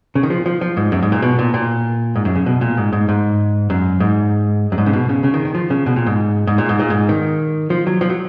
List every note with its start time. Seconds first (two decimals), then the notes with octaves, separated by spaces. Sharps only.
0.15 C#3
0.23 D#3
0.30 F3
0.46 F3
0.61 F3
0.77 G#2
0.92 F#2
1.02 G#2
1.12 A#2
1.22 B2
1.39 A#2
1.54 A#2
2.16 G#2
2.25 F#2
2.35 C#3
2.46 B2
2.61 A#2
2.77 G#2
2.93 G#2
3.09 G#2
3.70 F#2
4.00 G#2
4.72 F#2
4.78 G#2
4.86 C#3
4.93 B2
5.09 C#3
5.24 C#3
5.34 D#3
5.45 D#3
5.55 F3
5.70 C#3
5.86 B2
5.96 A#2
6.07 G#2
6.47 G#2
6.58 A#2
6.69 G#2
6.79 A#2
6.90 G#2
7.09 D#3
7.70 F3
7.87 F#3
8.01 F3
8.10 F#3